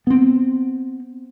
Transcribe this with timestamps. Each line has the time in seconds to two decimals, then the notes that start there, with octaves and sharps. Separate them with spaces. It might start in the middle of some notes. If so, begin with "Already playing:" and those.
0.07 B3 C4